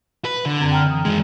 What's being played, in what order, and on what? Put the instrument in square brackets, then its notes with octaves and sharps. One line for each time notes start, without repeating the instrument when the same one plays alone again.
[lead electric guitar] B4
D3
[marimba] F#2 C4 G#6
G5 A#5 F6
E3 D#6
[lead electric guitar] D#3 G#3